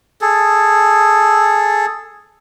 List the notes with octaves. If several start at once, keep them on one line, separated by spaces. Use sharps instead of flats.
G#4 A4